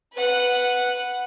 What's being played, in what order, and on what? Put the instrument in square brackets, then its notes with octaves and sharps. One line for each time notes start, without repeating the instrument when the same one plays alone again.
[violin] B4 F#5